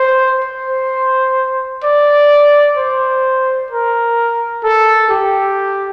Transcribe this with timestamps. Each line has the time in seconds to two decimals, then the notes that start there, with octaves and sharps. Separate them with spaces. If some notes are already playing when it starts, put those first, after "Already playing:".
Already playing: C5
0.44 C5
1.84 D5
2.77 C5
3.71 A#4
4.64 A4
5.10 G4